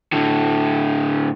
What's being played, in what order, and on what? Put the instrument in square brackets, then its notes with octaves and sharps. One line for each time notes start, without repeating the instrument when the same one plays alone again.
[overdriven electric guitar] A2 D3